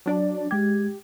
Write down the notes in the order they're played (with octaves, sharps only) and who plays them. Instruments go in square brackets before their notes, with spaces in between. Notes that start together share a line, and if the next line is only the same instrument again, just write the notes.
[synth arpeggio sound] F#3 D4 D5
[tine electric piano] G#3 G#6 [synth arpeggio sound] G4